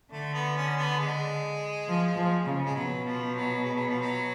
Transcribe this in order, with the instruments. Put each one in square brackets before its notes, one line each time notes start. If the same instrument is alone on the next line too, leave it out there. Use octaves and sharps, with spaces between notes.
[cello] D3 [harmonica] A3
[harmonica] B3
C#4
B3
G#3
[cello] F3
F3
C#3
[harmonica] G#3
[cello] B2 [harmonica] F#3
[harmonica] F3
F#3
G#3
F#3
F3
F#3